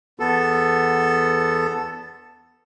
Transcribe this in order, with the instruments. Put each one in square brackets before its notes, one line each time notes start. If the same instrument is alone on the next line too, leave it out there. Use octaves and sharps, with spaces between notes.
[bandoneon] E2 B3 A4